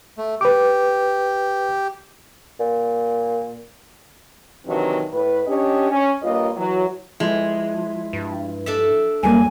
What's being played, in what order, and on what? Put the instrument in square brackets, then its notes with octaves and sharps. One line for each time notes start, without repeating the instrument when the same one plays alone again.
[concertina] A3
[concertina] G4 [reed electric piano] B4 D6
[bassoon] A#2
[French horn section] C3 D#3 E3 F#3 D4
A2 B4
C#4 D4 G4 C#5 D#5
C#4
G2 A#3 F4 C#5 D#5
E3 F#3
[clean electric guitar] F3 E4 [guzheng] G#3
[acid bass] G2
[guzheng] D4 A4 E5
[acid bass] E2 [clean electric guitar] G2 F#3 A#3 [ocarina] G#5